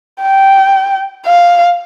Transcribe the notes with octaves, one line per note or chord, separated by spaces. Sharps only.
G5
F5